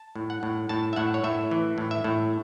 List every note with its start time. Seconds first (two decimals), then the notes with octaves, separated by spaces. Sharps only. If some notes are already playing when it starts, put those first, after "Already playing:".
Already playing: A5
0.15 A2
0.30 F#5
0.43 A2
0.69 A2 A5
0.93 E5
0.96 A2 F#5
1.14 C#5
1.24 A2 E5
1.51 E3
1.78 A2
1.91 E5
2.04 A2